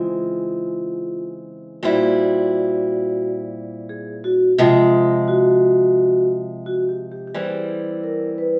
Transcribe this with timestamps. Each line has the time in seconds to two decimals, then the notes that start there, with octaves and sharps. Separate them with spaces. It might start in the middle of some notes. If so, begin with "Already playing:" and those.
Already playing: C#3 E3 G#3 C4 F4
1.83 A#2 G3 C4 E4 F#4
3.89 G#4
4.24 F#4
4.58 C3 F3 G#3 F4
5.28 F#4
6.66 F#4
6.89 G4
7.11 G4
7.27 G4
7.34 E3 G3 C4 G#4
8.04 A#4
8.38 B4